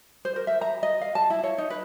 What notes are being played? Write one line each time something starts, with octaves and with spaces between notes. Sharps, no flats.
C5
A#4
E5
A#5
D#5
F5
A5
E4
C#5
D#4
B4